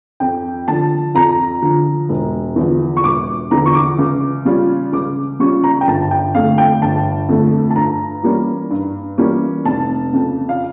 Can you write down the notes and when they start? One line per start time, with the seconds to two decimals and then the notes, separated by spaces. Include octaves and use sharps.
0.20 F2 G5
0.68 D3 F3 A5
1.15 F2 A#5
1.62 D3 F3
2.09 E1
2.56 E2 D3 F3
2.97 C#6
3.04 E1 D6
3.51 E2 D3 F3 A#5
3.66 C#6
3.75 D6
3.98 C#2
4.45 C#3 G3 C#4 F4
4.93 C#2 D6
5.40 C#3 G3 C#4 F4 C#6
5.64 A#5
5.81 G5
5.87 G1 A5
6.11 G5
6.35 F2 D3 A3 F5
6.58 G5
6.82 G1 A5
7.29 F2 D3 A3
7.70 A5
7.76 G2 A#5
8.23 E3 G3 A#3 C#4
8.71 G2
9.18 E3 G3 A#3 C#4
9.65 F1 A5
10.13 F2 C#3
10.49 F5